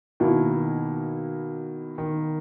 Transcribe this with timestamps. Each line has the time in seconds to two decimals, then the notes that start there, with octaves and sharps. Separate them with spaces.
0.20 B2 D#3 A#3 E4
1.98 D#3